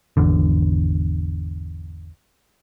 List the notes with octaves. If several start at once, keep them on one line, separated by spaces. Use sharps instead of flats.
G#1 E2 D3